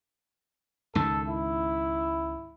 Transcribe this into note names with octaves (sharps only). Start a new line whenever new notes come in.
C#2 G#2 D#3 A4
E4